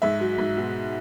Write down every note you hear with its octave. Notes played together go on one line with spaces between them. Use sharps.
G#2 E5
F#3
G#2
B2